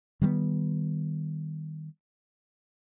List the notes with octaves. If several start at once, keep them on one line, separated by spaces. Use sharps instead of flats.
D#3 G3 G#3 B3